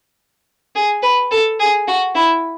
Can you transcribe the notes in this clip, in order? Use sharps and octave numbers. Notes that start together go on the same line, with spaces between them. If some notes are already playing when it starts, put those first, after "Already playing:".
G#4
B4
A4
G#4
F#4
E4